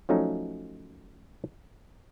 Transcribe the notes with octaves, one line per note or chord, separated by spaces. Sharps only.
F3 F#3 A3 C#4 D#4